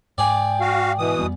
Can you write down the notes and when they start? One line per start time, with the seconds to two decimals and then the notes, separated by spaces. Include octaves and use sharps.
0.18 G#2 G#4 D5 G5
0.61 F#4 F5
0.98 B2 E3 D#6
1.19 F2 G3 B3